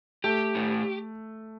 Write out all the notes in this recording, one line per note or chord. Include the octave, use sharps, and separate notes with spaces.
A3 G4
A2